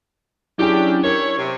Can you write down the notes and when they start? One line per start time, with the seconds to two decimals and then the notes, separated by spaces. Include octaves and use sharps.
0.58 F#3 C#4 D4 E4 G4 G#4 G5
1.04 E4 A#4 C#5 C#6
1.37 C3